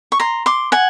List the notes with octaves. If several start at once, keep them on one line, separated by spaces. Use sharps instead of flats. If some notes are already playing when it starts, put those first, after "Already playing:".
C#6
A#5 C6
C6 D6
F#5 G#5